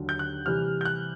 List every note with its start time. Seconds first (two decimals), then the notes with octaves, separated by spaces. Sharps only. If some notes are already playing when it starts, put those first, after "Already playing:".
Already playing: D#2 D3 F#3
0.09 G6
0.19 F#6
0.45 C3 E3 G3 F6
0.81 G6
0.85 F#6